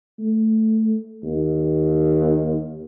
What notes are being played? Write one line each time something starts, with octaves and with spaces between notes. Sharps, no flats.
A3
D#2